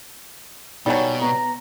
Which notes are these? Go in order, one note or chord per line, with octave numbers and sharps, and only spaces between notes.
B2 F#3 G3 D#4 C#5 G#5
B3 A#5